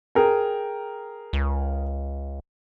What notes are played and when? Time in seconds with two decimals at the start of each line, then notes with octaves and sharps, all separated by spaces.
0.15 G#4 A#4 G5
1.33 C#2